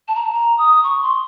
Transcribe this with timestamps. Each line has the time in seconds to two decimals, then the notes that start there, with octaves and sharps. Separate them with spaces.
0.08 A5
0.15 A#5
0.24 A5
0.33 A#5
0.58 D#6
0.84 C#6
1.03 C6